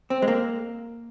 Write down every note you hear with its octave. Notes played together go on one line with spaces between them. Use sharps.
C4
G#3
A#3